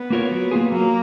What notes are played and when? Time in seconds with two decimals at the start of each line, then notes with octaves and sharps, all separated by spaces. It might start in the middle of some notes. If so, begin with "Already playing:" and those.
Already playing: B3
0.10 A#3 F4 A#4 C#5
0.31 F#3
0.51 A#3 F4 G#4
0.72 F#3 A#3